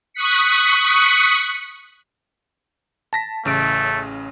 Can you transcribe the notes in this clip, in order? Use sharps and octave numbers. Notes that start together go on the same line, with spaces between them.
C#6 D#6 F#6 B6 C#7
A5 A#6 B6
A1 C#3 A3 D7